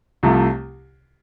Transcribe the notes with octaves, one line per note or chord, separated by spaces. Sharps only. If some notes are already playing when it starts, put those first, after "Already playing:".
C2 C3 F3 A3